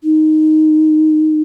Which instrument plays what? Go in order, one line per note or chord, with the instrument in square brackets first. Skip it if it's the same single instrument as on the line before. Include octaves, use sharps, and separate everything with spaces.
[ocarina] D#4